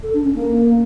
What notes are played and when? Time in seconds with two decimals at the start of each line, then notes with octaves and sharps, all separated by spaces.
0.03 A4
0.14 D4
0.24 C#4
0.35 A#3